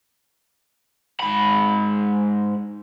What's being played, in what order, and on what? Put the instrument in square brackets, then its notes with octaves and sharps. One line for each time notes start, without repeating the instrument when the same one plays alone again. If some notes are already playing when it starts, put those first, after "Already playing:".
[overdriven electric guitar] G#2 B5